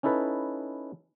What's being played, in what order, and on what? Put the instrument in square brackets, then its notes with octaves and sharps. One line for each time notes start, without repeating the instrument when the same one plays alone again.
[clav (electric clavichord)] C#4 D#4 E4 A4 B4